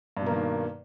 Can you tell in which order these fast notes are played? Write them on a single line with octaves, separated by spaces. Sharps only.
G2 B2 A#3 D#3